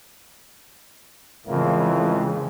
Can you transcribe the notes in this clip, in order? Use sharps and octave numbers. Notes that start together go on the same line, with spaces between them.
F2 A2 C#3 E3 G#3 A#3